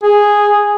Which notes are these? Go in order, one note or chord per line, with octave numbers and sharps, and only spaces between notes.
G#4